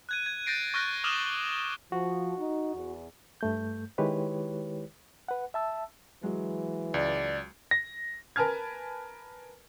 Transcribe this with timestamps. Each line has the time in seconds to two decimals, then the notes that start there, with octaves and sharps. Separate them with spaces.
0.09 F#6 G#6 D#7
0.26 G#6
0.46 G6 A6 A#6 C7 D7
0.74 C#6 F6 F#6 A#6
1.04 D6 D#6 F6 E7 F#7 G7
1.92 F3 F#4
2.39 D#4
2.76 E2
3.41 G2 A3 G6
3.98 D#3 G#3 E4 G4 B4 C#5
5.28 B4 F#5
5.54 E5 A5 E6
6.23 E3 F#3 G#3
6.94 C#2 D5
7.71 A#6
8.36 A#4 B4 G#5 A5 F6 G#6